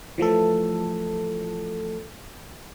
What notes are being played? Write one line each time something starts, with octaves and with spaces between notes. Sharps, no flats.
E3 F3 A3 A4